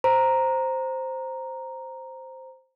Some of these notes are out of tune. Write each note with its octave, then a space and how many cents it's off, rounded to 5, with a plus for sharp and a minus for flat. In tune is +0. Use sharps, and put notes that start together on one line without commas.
C5 +0 A#5 +0